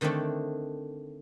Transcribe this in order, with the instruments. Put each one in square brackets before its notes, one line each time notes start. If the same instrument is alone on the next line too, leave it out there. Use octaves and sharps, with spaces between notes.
[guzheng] D3 D#3 A3 C4 D4 A4